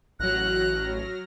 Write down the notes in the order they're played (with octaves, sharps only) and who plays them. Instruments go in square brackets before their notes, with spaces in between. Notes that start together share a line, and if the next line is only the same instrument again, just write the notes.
[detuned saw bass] A1 [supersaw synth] F#3 F6 A#6 [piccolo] F#6